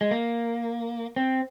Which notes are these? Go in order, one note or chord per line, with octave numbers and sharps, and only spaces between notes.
G#3
A#3
C4